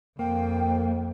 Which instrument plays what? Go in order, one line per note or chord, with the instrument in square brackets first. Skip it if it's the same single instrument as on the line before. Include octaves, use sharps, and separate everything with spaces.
[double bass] F2 [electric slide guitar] A#3 [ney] G5